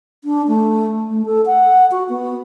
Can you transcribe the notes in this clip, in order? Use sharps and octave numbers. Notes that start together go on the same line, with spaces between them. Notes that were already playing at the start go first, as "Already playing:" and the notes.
D4
A3
A3
A4
F#5
F#4
B3